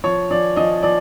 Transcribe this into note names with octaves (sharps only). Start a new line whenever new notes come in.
F3 C#5
F3 D5
F3 D#5
F3 D5